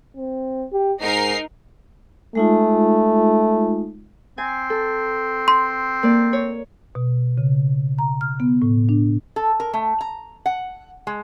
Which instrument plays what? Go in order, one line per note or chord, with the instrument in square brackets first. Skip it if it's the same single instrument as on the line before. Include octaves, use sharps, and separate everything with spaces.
[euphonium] C4
G4
[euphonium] G#2 [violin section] D#4 A#4 C7
[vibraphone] G#3 D#4 F4 [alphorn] A3
[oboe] C4 [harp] G#5
[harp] A4
[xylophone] C6
[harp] A#3 D5
C#5
[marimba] B2
C#3
A#5
F6
B3
A2
D4
[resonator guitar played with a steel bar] A4
A#4
A3
A#5
F#5
G#3